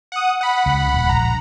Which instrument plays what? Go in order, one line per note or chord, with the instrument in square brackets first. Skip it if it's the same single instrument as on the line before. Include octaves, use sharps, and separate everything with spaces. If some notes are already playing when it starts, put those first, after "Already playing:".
[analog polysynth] F#5 D#6
F#5 B5
[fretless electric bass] C#2
D#1
[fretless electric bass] A#1 [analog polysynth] A#5